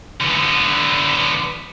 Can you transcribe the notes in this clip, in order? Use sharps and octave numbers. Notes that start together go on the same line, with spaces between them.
D3 B3